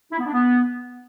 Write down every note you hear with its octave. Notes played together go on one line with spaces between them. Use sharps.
E4
B3
D4
B3